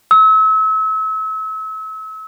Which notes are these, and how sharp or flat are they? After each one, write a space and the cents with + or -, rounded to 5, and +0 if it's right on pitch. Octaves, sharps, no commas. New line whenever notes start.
E6 -35